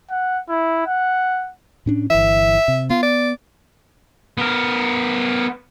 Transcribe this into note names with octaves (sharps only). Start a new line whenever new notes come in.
F#5
E4
F#5
A2 C#4 D4
G1 E3 E5
C3
B3 F4
D5
B3 A#4